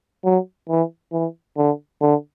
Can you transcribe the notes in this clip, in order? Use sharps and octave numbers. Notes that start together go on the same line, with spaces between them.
F#3
E3
E3
D3
D3